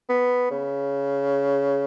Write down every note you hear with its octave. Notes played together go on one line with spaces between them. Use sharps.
B3
C#3